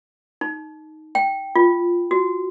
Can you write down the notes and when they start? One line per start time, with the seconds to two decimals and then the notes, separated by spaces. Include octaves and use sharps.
0.41 D#4
1.15 G5
1.55 F4
2.11 F#4